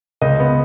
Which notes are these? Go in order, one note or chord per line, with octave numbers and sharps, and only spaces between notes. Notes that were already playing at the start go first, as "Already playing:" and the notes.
C#2 D#5
B3